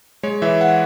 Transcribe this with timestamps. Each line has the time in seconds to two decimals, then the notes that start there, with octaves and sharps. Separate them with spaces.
0.23 G#3 C#5
0.42 E3 E5
0.61 F#5